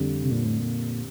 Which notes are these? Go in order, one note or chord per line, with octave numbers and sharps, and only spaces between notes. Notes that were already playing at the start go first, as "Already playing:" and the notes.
Already playing: F2 D3 G3
C3
A#2
A2
A#2